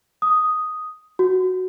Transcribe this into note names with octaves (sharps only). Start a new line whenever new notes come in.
D#6
F#4